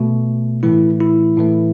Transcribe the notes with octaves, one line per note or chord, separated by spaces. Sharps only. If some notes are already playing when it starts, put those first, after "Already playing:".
Already playing: B2 A3
A2 E3 A3 E4
E4
A2 E3 A3